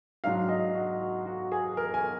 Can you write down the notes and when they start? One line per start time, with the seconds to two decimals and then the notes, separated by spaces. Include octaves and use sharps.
0.24 G#2 F#3 D4 F5
0.49 D#5
0.75 F#4
1.01 F#4
1.26 F#4
1.52 G#4
1.77 A#4
1.94 G#5